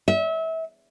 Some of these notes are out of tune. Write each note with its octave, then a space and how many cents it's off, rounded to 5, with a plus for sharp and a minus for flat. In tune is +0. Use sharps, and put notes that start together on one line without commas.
E5 -30